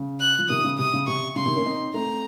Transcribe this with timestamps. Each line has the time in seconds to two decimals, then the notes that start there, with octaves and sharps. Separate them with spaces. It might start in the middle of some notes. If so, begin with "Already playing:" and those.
Already playing: C#3
0.20 F#6
0.39 F3
0.49 C3 D#3 D#6
0.64 C#3
0.78 C3 D#6
0.94 C#3
1.07 C3 C#6
1.36 C#3 C6
1.46 C3 D#3
1.56 A#3 C#4
1.65 C4 D#4
1.94 A3 C4 A#5